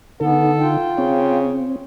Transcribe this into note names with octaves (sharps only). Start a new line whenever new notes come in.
D3 B3 D#4 A4
F4 G5
C#3 C4